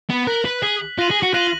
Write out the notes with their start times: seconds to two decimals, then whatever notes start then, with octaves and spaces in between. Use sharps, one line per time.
0.10 B3
0.27 A#4 F#6 B6 F#7
0.45 B4
0.62 G#4 F#6 B6 F#7
0.98 F4 F#6 A#6 D#7 F#7
1.11 G#4
1.23 F#4
1.34 F4 F#6 A#6 D#7 F#7